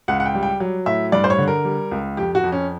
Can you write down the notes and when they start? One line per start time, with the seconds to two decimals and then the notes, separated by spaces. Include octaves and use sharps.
0.08 C#2 F#5
0.20 F#5
0.26 G5
0.35 G3
0.43 G5
0.60 F#3
0.86 A2 E5
1.12 G2 D5
1.24 C5
1.30 C#5
1.38 D3
1.48 A#4
1.65 G3
1.91 C#2
2.17 F2 G4
2.35 F#4
2.44 F2
2.52 C#4